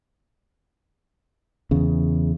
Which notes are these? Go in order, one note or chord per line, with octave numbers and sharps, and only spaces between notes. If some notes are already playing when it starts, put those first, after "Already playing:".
E2 C#3